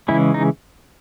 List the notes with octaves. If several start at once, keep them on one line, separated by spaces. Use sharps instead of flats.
C#3 E3 G#3 C#4 E4
D#4